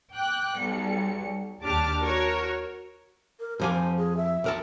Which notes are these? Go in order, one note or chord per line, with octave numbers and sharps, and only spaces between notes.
G5 D6 F#6
B1 G3 C#7
D#2 D4 G4 A5 D6 F6
F#4 A#4 C#5
A#4
F2 F3 G4 G#5
C5
G#4
E5
B1 A#4 A5